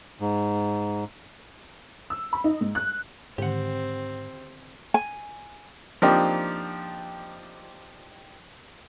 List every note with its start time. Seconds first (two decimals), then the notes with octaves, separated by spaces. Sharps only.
0.20 G#2
2.10 E6
2.33 B5
2.44 D#4
2.61 G#2
2.75 F#6
3.38 G#2 D3 D#3 C4 G4 F#5
4.94 G#5
6.02 F3 A#3 C4 D4 D#4 G4